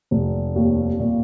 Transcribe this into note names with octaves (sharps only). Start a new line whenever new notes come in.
F1
D#2
A#2